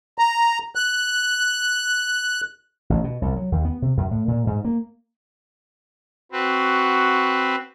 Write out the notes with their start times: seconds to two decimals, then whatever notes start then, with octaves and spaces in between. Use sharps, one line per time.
0.18 A#5
0.75 F#6
2.90 A1
3.04 B2
3.22 C2
3.36 F#3
3.52 D#2
3.65 B3
3.82 C3
3.97 F#2
4.11 A2
4.28 A#2
4.47 G#2
4.65 A#3
6.32 C4 F#4 B4